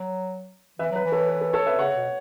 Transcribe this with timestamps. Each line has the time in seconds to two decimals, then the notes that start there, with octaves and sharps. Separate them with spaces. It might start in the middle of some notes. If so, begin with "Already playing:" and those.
Already playing: F#3
0.79 E3 B4 E5
0.92 F#3 B4
1.04 E3
1.12 A4 C#5
1.29 B4
1.41 A4
1.53 A4 C#5
1.66 B4 E5
1.78 C#3 C#5 F#5
1.96 B2